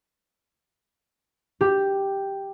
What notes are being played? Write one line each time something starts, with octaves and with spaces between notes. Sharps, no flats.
G4